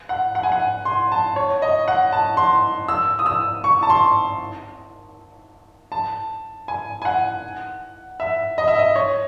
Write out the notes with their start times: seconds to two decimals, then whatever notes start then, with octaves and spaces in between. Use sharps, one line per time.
0.09 F#5
0.35 F#5
0.43 G#5
0.52 F#5
0.85 C6
1.12 A5
1.36 C#5
1.62 D#5
1.88 F#5
2.13 A5
2.37 C6
2.88 E6
3.19 D#6
3.26 E6
3.64 C#6
3.83 A5
3.90 C6
5.92 A5
6.68 G#5
7.02 G#5
7.05 F#5
8.20 E5
8.58 D#5
8.68 E5
8.79 D#5
8.96 C#5